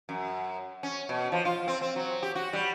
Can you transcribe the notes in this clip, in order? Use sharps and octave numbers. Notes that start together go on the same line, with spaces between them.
F#2
C#4
B2
F3
F4
C4
C4
F#3
G4
F#4
G3